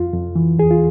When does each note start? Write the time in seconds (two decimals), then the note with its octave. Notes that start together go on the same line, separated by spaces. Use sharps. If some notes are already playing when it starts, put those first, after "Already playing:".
Already playing: F2 F4
0.13 F2
0.36 E3
0.58 E2 G#4
0.71 F4